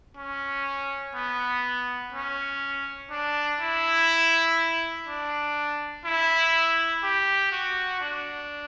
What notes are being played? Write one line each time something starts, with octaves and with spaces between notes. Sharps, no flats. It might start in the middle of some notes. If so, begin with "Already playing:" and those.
C#4
B3
C#4
D4
E4
D4
E4
G4
F#4
D4